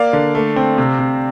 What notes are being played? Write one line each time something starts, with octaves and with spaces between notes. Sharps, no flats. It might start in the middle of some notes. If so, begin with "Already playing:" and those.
Already playing: A#3 D5 F5
D3
A3
C4
C3
C3